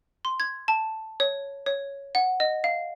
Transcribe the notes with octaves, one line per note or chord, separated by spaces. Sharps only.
C6
G#6
A5
C#5
C#5
F#5
D#5
F5